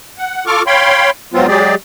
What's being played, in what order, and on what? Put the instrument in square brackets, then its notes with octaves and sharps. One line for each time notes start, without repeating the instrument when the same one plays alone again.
[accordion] F#5
F4 A4 C#6 D6 F6
C#5 F5 G5 B5 C6
G#2 F3 F#3 B3 C4 F4
F#3 G#3 G4 G#4 D5